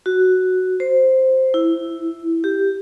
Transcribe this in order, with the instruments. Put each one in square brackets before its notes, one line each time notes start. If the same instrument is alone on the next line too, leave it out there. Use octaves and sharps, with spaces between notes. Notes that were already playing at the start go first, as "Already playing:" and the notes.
[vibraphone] F#4
C5
E4
G4